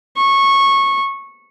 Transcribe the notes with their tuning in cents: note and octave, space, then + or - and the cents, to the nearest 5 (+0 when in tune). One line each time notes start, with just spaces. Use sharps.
C#6 -15